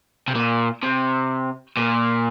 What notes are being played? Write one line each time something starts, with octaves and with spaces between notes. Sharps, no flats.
C3
A#2
C3
A#2